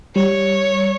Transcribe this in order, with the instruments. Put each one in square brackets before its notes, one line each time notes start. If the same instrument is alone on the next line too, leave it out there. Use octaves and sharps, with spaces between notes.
[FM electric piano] G3 [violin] C#5